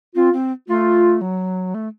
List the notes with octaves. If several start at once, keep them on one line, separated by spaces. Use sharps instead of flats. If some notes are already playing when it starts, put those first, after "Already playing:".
C4 F4
C4
A3 F4
F#3
A3